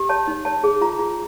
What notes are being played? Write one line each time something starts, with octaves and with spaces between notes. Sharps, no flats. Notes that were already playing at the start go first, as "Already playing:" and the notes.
Already playing: G4
C#5 A5
D#4
C#5 A5
G#4
F4 A#5
F4